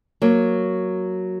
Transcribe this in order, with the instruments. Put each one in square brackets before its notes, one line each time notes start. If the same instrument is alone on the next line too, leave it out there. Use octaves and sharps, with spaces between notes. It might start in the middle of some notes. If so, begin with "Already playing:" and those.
[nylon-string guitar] F#3 A#3